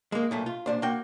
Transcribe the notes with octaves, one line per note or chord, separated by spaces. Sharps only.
G#3 A#3
B1 A#2 A3
F4
A#2 D4 C5
A#3 F#4 G5